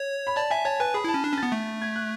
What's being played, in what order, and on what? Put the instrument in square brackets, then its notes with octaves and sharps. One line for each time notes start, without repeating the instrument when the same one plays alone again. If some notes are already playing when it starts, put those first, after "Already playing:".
Already playing: [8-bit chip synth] C#5
[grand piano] B5
[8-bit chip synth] D5 [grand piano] A5
[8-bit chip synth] E5 [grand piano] G#5
[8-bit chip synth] C#5 [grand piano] A5
[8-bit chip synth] B4 [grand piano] G#5
[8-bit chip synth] G#4 [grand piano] B5
[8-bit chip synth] E4 [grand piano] A5
[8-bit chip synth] C#4
D4
[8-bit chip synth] C#4 [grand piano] A6
[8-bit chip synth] B3
A3
[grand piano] G#6
F#6